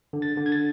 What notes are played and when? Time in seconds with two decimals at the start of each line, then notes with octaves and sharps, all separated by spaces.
0.13 D3
0.22 A6
0.37 D3
0.46 G#6
0.52 A6